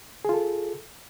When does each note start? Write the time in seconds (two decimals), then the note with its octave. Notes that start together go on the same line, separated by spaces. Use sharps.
0.25 G#4
0.29 F4
0.34 A4